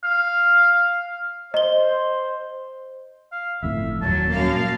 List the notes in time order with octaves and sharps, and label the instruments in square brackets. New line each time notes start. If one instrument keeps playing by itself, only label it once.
[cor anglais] F5
[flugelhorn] C5 [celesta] D#5 G7
[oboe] F5
[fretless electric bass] G1 F2 A2 [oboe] E5
[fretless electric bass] D#1 [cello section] F#2 F#3 [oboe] A5
[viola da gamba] F#2 [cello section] A#3 F5